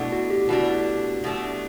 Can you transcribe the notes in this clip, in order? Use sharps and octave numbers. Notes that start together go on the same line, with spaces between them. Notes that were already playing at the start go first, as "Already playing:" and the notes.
Already playing: B2 A3 D4 E4
F#4
G4
B2 A3 D4 F#4
B2 A3 D4